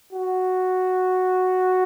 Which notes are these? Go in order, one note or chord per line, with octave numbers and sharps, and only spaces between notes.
F#4